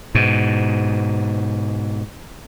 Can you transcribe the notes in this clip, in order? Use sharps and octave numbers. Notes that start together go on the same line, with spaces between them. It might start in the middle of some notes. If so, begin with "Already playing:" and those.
G#2 B2